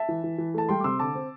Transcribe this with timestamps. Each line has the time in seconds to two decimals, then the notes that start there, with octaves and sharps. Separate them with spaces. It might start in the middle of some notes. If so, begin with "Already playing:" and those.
Already playing: E5 A5
0.08 E3
0.24 E3
0.38 E3
0.54 A3 A5
0.69 G3 G5 C6
0.80 D6
0.84 C3 C6 E6
0.99 D3 A5 D6
1.15 C4